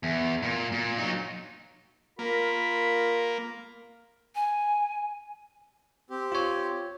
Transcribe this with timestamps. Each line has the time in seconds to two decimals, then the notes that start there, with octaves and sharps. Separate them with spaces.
0.03 E2
0.42 A#2
0.72 A#2
0.98 F#3 D#4
2.19 A#3 F4 A#4 B5
4.35 G#5
6.10 C4 G4
6.32 F4 C#5